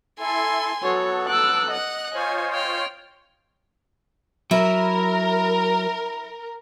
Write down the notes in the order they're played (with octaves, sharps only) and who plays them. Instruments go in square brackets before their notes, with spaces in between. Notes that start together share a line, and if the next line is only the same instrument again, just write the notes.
[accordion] E4 A4 [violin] G#5 C6
[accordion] F#3 B3 A4 [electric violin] F#4 C#5
[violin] D6 [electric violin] E6 F#6
[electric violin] D#5 [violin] F#5 F#6
[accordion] F4 C5 C#5 [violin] G#5
[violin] G5 F6
[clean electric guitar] F#3 [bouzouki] E4 [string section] A#4